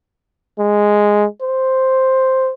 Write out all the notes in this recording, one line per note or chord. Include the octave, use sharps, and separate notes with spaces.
G#3
C5